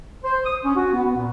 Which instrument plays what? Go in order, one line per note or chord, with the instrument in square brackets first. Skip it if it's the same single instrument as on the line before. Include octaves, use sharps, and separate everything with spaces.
[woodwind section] C5
D#6
C#4
F#4
B3
B3
A#2